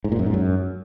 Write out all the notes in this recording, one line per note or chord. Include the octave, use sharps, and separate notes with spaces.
G#2
A#2
F#2
G#2
F#2